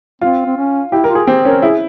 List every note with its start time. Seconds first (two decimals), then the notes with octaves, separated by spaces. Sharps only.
0.21 C4 F4
0.46 C4
0.57 C#4
0.92 E4 G4
1.04 A#4
1.10 F4
1.15 G#4
1.27 C4 G4
1.45 C#4 A#4
1.62 E4 G#4